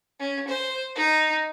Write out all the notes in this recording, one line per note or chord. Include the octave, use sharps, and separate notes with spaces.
C#4
C5
D#4